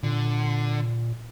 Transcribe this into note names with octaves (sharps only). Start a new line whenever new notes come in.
A#2 D3